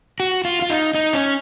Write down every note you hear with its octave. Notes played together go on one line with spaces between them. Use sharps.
F#4
F4
F4
D#4
D#4
C#4